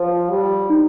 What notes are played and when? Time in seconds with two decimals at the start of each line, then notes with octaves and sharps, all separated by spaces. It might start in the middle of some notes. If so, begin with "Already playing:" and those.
Already playing: F3
0.30 G3
0.69 D#4